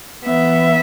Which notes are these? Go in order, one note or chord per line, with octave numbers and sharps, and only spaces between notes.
E3 B3 E5